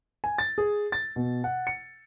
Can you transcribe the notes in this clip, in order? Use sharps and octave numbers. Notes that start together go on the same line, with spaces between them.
G#5
A6
G#4
A6
B2
F#5
C#7